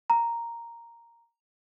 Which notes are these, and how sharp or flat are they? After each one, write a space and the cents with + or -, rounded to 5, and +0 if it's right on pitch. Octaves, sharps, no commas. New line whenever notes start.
A#5 +0